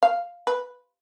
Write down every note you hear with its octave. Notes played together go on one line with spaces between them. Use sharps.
F5
B4